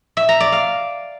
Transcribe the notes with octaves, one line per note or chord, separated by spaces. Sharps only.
E5
A#5
D5
F5